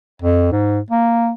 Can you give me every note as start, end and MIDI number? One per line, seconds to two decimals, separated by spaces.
0.22 0.51 41
0.52 0.79 44
0.90 1.31 58